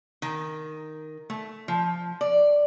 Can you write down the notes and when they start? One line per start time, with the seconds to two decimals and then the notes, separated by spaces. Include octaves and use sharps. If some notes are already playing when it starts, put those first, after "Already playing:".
0.22 D#3
1.30 A3
1.68 F3
2.21 D5